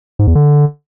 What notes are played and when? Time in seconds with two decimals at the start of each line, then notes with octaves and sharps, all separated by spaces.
0.19 G#2
0.27 E2
0.35 D3